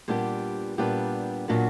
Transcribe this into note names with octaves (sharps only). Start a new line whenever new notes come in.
A#2 G3 B3 D4 G4
A#2 G3 B3 D4 G4
A#2 F#3 B3 D4 F#4